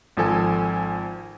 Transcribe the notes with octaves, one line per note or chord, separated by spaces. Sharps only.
G#1 F3 A4 G#5